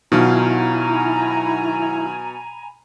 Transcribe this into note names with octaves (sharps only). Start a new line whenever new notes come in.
B2 D#3 F#3 E4 F4 G#5 A#5 B5